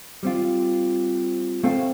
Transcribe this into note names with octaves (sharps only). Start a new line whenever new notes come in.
G3 C4 F4
A3 C4 A4 C5 F5